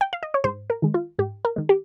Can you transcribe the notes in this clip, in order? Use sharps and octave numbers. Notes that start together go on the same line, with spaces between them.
G5
F5
D#5
C#5
G#2 C5
A#4
D#3 G#3
F4
G#2 G4
A#4
D#3 G#3
G4